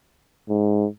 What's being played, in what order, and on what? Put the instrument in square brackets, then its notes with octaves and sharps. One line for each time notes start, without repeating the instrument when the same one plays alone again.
[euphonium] G#2